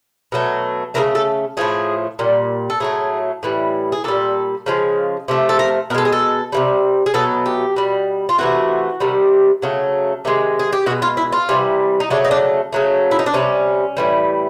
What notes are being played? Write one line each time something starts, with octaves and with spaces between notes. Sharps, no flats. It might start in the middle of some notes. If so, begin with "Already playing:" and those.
B2 F#3 A3
C#3 E3 A3 A#4
A4
A2 F3 A3 G#4
A#2 G3
A4
A2 F#3 A3 G#4
A2 E3 G3
G#4
A#2 G3 A4
C#3 F3 G#3
C3 F3 A3
A4
A#4
B2 G#3 A4 A#4
G#4
A4
C3 E3 G3
G#4
B2 F#3 A3 A4
G4
B2 G3
F4
C3 E3 A3 F#4
C3 D#3 G3
C#3 F#3 A3
C3 D#3 G#3
G#4
G4
B2 G#3 F#4
F4
E4
F4
C3 E3 G3
D#4
C#3 F#3 A3 D4
D#4
D4
C#3 F#3 A3
E4
D#4
D4
C3 D#3 G3 C#4
A2 E3 G3